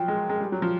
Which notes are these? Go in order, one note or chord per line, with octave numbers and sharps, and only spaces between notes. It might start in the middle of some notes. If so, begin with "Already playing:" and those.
Already playing: F3 F#3 G5
G#3
G#3
G3
F#3
F3